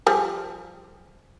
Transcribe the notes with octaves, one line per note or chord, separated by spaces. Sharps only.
F3 G3 G#4